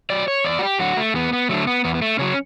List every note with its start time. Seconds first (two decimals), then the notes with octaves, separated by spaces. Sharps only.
0.10 F#3 D5
0.28 C#5
0.44 E2 D5
0.59 F#4
0.63 G4
0.79 D3 F#3 F#4
0.97 A3
1.14 E2 B3
1.33 B3
1.49 D3 F#3 A3
1.67 B3
1.84 E2 B3
1.95 B3
2.02 A3
2.19 C#3 F#3 C#4